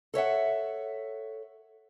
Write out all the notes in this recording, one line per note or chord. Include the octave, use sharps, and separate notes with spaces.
A4 C#5 E5 F#5